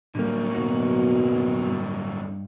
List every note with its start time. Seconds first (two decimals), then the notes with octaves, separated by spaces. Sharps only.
0.15 D1 D3 F#3 G3 A#3
0.54 F#2 B2 D#4 F#4
1.65 G2